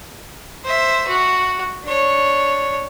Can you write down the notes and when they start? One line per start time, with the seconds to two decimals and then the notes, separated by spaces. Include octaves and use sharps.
0.64 C5 E5
1.07 F#4
1.84 D4 C#5